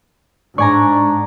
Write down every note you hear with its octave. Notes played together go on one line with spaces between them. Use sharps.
G#2 D4 D5 G#5 A#5 C#6